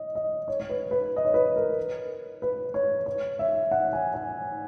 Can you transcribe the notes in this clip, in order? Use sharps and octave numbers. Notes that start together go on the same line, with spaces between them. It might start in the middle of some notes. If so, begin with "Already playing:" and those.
Already playing: D#5
D#5
C#5
C#5
B4
B4
D#5
C#5
B4
A#4
B4
C#5
C#5
E5
F#5
G#5
G#5